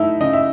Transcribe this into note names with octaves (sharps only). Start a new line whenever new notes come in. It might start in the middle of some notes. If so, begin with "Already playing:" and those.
Already playing: A3 D#4 E4 E5
C#3 D#5
E5